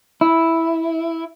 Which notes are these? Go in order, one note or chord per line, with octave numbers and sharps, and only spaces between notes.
E4